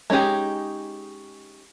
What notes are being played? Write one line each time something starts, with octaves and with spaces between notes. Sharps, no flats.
G#3 C#4 D#4 G4 G#4